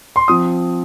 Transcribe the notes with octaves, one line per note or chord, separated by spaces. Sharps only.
C6
F3 C4 D#6